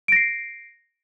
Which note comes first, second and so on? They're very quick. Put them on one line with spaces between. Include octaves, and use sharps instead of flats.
D7 A#6 C7